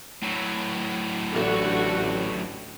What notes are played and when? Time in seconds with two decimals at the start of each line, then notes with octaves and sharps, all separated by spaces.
0.22 A2 F#3
1.34 A1 D3 A3 F#4